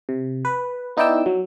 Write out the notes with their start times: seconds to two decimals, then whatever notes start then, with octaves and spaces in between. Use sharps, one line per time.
0.09 C3
0.45 B4
0.97 B3 D#4 E4 D5 G5 E6
1.26 F#3